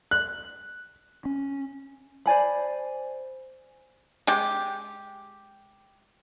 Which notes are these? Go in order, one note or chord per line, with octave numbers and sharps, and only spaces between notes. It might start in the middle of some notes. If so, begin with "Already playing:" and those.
F#6
C#4
C5 D5 G#5 B5
G#3 G4